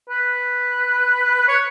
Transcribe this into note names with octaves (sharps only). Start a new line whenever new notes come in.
B4
C#5